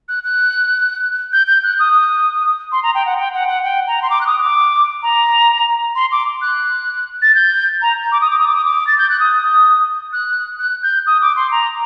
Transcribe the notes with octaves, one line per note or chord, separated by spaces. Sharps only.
F#6
F#6
G6
G6
F#6
D#6
C6
A#5
G5
F#5
G5
F#5
F#5
G5
A#5
C6
D6
F#6
D#6
D6
A#5
C6
D6
F#6
A6
G6
A#5
D6
D#6
D6
D#6
D6
D#6
D6
A6
G6
F#6
D#6
F#6
F#6
G6
D#6
D6
C6
A#5